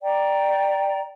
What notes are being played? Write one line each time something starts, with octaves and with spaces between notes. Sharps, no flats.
D5 G5 A#5